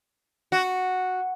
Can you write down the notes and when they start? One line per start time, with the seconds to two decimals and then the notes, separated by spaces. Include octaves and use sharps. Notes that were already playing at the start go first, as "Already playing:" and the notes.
0.52 F#4